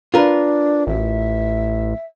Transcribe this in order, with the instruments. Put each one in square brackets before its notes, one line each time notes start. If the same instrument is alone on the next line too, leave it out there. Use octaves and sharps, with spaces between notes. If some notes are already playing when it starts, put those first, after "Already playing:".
[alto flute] D4 [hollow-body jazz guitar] F4 A#4 B4
[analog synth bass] A1 [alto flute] E5